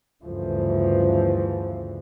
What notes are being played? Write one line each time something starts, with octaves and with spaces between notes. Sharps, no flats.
D2 G2 C#3 E3 F3